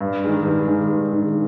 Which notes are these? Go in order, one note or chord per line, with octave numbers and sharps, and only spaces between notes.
G2
D#3 G#3
G2
D#3 G#3
G2
D#3 G#3